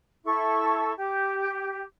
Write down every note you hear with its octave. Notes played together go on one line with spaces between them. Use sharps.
E4 A4 C#6
G4